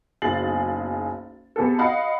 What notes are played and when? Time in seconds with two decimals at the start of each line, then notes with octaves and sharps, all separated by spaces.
0.22 F#1 B1 G#4 A6 C7 F#7
1.56 C3 B3 G#4 A4
1.79 D#5 F5 F#5 B5